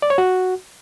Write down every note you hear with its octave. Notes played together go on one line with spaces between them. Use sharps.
D5
C#5
F#4